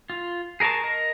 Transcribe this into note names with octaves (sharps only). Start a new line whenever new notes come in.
F4
G#4 A#4 D#5 A5 C#6
A#4 D#5